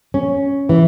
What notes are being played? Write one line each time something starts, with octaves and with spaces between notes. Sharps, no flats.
C#4
E3